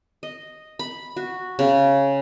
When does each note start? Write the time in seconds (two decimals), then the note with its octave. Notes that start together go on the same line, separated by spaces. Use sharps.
0.23 D#5
0.79 B5
1.17 F#4
1.59 C#3